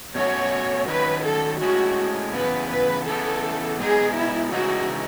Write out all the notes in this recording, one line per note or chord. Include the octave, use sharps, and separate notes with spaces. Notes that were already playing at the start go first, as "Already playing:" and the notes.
B2 A3 C#4 F#4 C#5
D#3 F#3 C#4 B4
A4
A2 G#3 C#4 F#4
E2 C#3 B3 B4
B4
C#3 E3 B3 A4
B2 G#3 B3 D#4 G#4
E4
C#3 E3 G#3 D#4 F#4